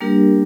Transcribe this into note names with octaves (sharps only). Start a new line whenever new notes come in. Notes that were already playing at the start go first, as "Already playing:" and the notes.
G3 A#3 D4 G4 A#4